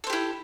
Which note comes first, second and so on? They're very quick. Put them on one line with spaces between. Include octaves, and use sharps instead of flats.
A4 C4 G4 E4